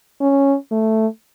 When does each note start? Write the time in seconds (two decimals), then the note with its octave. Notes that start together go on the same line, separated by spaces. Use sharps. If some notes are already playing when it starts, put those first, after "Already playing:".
0.21 C#4
0.71 A3